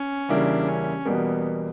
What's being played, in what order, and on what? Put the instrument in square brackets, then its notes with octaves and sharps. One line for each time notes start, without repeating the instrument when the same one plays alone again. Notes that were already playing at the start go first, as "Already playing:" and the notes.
Already playing: [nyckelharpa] C#4
[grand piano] E2 C#3 G3 A#3 E4 [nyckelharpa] D4
[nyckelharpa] C#4
[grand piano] E2 B2 G3 A#3 [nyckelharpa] B3